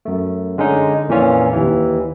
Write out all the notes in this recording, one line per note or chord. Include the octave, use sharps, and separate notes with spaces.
F#2 A3
D3 G#3 C#4 D#4
F2 A#2 E3 C#4 F4
D#2 E3